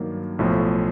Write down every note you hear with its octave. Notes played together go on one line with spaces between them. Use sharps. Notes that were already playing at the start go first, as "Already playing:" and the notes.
Already playing: G2 D#3 F#3 A#3
B1 A2 F3